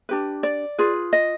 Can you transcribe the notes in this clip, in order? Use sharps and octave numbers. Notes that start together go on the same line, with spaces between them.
D4 G4 B4
D5
F4 G#4 B4
D#5